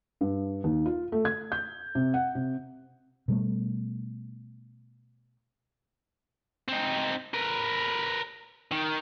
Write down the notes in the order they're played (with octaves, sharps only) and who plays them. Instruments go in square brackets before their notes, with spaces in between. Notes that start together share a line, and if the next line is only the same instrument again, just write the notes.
[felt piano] G2
D#2
F4
A3
G#6
G6
C3
F#5
C3
[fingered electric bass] B2 G3 A3
[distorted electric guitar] C4 D#4
A#4 B4
D#3